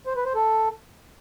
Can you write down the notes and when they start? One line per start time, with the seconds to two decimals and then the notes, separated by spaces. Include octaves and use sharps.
0.06 C5
0.16 B4
0.25 C5
0.35 A4